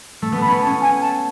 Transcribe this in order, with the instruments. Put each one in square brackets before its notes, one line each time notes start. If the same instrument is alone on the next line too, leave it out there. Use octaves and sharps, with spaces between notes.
[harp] A3
B3
[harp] A3 [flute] B5
[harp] C#4
B3
[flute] A5
[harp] C#4
[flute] G#5
A5